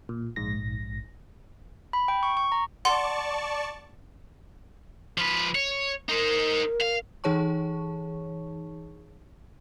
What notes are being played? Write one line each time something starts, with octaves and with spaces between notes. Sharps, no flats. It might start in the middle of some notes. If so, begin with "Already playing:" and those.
A#2
A#1 G#2 A#6
B5
G5
C#6
C#6
A#5
D5 F#5 A5 C6 C#6
F3 B4
C#5
D#4 A#4 C5
F5
E3 D#4 G#4 C#5 A5 C#6